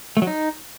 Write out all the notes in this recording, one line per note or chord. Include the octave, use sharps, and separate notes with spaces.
A3
F#3
D#4